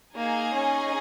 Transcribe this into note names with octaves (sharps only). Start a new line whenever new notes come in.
A#3 D#4 G#4 D#5 G#5
C#4